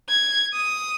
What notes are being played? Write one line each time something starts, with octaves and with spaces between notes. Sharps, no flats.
G#6
D#6